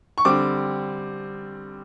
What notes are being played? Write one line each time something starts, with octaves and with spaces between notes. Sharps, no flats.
C#6
D3 G3 C4 D6